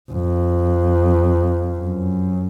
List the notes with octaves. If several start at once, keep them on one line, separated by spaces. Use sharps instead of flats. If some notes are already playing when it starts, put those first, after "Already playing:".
F2
F#2